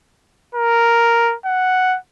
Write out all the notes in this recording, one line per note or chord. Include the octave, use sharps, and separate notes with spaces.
A#4
F#5